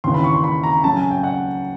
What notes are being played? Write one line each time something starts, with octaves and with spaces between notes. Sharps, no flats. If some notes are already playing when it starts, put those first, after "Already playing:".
D#2 C#3 E3 C6
B5
C#6
C6
B5
A#5
C#2 C#3 F#3 A5
G#5
G5
F#5